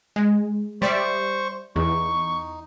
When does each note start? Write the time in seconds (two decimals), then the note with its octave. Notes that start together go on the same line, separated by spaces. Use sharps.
0.16 G#3
0.82 G3 C5 D5 E5 C#6
1.76 E2 D#4 C#6